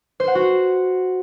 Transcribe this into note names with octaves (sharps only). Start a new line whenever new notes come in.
C5
F#5
F#4